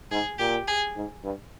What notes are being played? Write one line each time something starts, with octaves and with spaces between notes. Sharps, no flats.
G#2 G#4
A#2 G4
G#4
G#2
G2